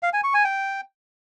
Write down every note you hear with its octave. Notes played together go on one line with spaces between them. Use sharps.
F5
G#5
C#6
G#5
G5